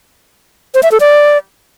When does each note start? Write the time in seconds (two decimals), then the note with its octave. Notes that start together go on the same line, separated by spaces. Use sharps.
0.74 C5
0.83 E5
0.92 A4
1.00 D5